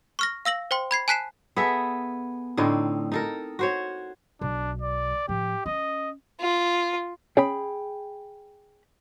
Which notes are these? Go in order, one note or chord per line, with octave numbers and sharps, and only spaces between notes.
C#6 F6 A#6
F5 E6 A#6 F#7
C5 G5 C6
B5 G#6 C7
G#5 A5 F#6 B6 C7 E7
B3 G#4 A4 E5
A2 D3 C4 D#4
D#4 A4 A#4
F#4 C5 C#5
B1 D4
D5
A2 F3 G4
C#4 D#5
F4
C#4 G#4 G5 B5